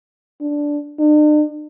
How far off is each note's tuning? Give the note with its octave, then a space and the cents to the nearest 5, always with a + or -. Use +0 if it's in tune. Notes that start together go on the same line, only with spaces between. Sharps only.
D4 -5
D4 +45